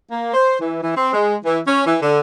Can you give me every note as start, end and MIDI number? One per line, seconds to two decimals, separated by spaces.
0.11 0.32 58
0.34 0.56 72
0.60 0.82 52
0.82 0.94 52
0.96 1.13 60
1.13 1.36 56
1.45 1.59 52
1.67 1.83 61
1.87 1.96 52
2.02 2.21 50